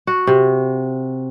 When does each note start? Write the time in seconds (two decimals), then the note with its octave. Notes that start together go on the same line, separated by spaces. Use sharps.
0.07 F#4
0.27 C3